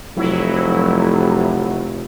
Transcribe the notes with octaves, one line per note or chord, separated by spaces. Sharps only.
F1 F#3 E4